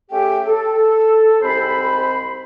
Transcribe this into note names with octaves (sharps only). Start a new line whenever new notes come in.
A3 C#4 G4 G#4 E5 G5
A4
C2 G#2 C4 C5 B5